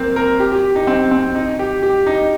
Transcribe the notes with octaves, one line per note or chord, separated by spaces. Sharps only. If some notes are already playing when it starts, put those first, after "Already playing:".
Already playing: A#3 C4
A#4
G4
G4
D#4
C4
C4
D#4
G4
G4
D#4